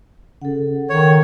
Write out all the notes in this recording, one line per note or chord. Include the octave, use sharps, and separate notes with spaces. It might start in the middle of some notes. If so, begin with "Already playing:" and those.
C#3 A4 F#5
D#3 C#5